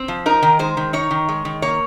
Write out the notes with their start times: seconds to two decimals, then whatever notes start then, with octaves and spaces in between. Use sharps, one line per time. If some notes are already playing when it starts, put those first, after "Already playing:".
Already playing: C4
0.08 F3
0.26 D#4 A#4
0.43 D#3
0.59 G#3 C5
0.77 D#3
0.93 D#4 C#5
1.11 D#3
1.29 G#3
1.45 D#3
1.62 A#3 C#5